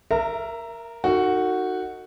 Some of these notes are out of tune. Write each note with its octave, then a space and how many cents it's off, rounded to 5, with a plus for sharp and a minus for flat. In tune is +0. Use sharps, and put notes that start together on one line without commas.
A#4 +0 E5 +20 A#5 -35
D#4 +5 F#4 +0 A4 +45